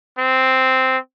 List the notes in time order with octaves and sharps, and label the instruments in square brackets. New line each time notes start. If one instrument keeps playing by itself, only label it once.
[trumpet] C4